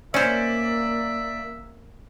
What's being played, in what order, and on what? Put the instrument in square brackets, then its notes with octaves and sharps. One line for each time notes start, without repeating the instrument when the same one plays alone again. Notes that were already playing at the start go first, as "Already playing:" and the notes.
[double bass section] A#3 [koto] C#4 C5 [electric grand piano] D5 [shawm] E5